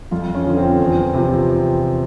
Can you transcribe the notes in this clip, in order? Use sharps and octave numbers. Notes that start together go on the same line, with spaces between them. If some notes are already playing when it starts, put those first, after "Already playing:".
F2 F4
C#4
D3 F3
C4
E2
C3 F3